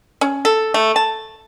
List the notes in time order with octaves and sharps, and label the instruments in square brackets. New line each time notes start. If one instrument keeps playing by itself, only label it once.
[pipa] C#4
A4
A3
A5